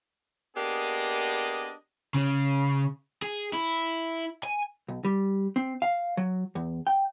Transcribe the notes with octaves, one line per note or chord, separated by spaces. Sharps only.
A#3 B3 D4 G4 G#4 D#5
C#3
G#4
E4
G#5
B1
G3
C4
F5
F#3
E2
G5